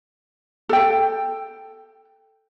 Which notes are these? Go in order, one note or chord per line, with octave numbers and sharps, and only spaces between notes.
A4 G5